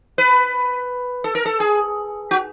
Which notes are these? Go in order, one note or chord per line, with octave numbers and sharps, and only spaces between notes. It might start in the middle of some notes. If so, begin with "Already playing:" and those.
B4
A4
A#4
A4
G#4
F#4